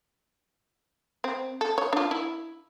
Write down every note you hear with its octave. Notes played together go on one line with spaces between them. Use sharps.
C4
A4
C#5
D4 F4
E4